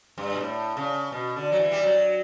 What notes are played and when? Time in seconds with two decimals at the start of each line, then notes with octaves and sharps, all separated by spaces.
0.18 G2
0.34 B2
0.41 A2
0.77 C#3
1.12 B2
1.36 D3
1.52 F#3
1.59 E3
1.72 G3
1.83 F#3